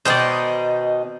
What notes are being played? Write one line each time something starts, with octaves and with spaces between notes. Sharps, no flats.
B2 D#3 D#4 C5 D5